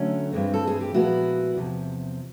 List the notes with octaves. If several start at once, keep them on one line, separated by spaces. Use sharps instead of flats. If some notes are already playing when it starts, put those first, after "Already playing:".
Already playing: D3 F#3 A3 C#4
G2 E3 G#3 C4
A4
G#4
G4
A#2 F3 G#3 B3 E4 F#4
E2 C3 F3